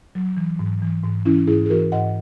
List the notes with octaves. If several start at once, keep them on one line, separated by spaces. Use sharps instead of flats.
F#3
E3
G#2
E3
G#2
E3 C#4 E4
G#2 E4 G#4
G#4
E3 F#4 A#4
G#2 D#5 F#5